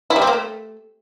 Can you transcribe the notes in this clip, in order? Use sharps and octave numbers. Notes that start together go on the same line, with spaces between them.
E4
G3
C4
A#3
A3